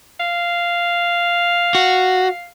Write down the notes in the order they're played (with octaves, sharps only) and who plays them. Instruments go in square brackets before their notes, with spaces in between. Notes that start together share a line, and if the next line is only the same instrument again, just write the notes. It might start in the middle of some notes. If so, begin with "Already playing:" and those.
[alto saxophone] F5
[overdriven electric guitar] F#4